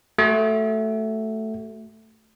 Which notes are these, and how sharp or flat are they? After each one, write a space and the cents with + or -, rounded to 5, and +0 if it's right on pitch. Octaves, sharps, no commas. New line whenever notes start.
A3 +0 F#4 +30